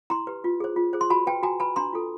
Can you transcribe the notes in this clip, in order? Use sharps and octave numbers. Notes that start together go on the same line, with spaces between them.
E4 A#5 C6
G4 B4
F4
G#4 C5
F4
G#4 C5
C6
F#4 A5 B5
B4 G5 A5
F#4 G#5 A#5
B4 A5 B5
D4 A#5 C6
F4 A4